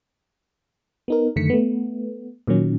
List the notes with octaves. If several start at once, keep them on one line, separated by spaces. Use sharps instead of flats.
B3 D#4 A#4
F#2 D3 D#3 A3 B6 C#7
A3 B3
A#2 D#3 F#3 C#4